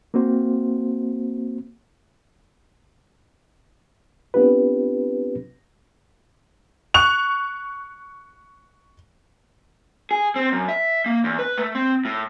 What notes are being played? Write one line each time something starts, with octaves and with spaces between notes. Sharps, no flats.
A#3 C4 F#4 C5
B3 C4 D4 F4 G4 B4
C#6 F#6 F7
G#4
C4
F#2
E5
A#3
E2
B4
A3
C4
A2